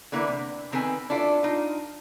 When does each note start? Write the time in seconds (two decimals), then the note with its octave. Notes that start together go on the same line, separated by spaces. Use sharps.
0.12 D3 E3 A#3 E4 B4
0.27 C3
0.72 D#3 C4 A4 B4 G#5
1.09 C#4 D4 E4 F4 A4
1.43 D#4 F4